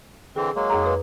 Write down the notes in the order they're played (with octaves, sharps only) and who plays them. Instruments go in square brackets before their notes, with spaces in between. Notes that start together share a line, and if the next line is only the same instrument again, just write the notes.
[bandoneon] D3 E3 C4 [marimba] G#4
[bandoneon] F#3 G#3 A#3
[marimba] F2 G#4 A#5
B4 D#6